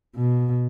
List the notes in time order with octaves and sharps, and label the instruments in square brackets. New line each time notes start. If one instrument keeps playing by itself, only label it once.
[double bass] B2